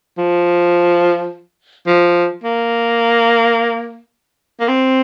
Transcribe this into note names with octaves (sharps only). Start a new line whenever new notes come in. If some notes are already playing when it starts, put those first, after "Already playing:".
F3
F3
A#3
A#3
C4